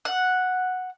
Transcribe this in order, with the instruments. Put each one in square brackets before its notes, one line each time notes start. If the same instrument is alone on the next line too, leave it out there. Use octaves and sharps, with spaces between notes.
[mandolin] F#5